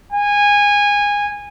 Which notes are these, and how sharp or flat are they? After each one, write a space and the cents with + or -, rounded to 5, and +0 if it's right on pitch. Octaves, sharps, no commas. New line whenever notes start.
G#5 -20